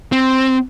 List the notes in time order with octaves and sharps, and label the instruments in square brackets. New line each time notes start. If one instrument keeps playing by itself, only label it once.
[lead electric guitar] C4